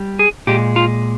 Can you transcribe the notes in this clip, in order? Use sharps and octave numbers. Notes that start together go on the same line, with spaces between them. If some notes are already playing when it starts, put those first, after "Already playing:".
Already playing: G3
G#4
A#2 G#3 G4
F4